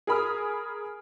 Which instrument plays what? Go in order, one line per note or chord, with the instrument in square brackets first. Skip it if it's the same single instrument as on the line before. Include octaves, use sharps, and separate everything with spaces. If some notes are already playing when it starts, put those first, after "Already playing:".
[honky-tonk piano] G#4 A#4 B5 D#6 F6